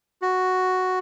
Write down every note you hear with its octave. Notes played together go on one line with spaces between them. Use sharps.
F#4